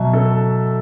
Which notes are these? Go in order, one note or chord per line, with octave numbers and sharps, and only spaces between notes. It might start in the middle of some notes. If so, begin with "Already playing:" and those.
Already playing: B2 F#3 E5
A4